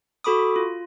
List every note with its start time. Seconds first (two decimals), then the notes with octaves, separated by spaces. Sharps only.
0.24 F#4 A4 B5 D6 D#6
0.56 F4